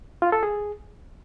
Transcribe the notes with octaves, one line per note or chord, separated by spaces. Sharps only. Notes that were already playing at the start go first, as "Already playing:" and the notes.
F4
A4
G#4